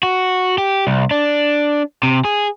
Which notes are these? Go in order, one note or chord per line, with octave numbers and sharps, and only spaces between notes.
F#4
G4
C2
D4
C3
G#4